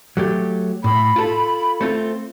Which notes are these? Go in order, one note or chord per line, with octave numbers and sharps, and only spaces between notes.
F#3 A3 G4
A2 B5
F4 A4
A3 C4 F4